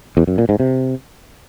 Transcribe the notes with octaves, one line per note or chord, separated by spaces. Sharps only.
E2
F#2
A#2
G#2
C3